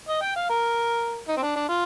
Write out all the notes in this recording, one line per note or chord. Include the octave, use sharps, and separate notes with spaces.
D#5
G5
F5
A#4
D#4
C4
D4
D4
F4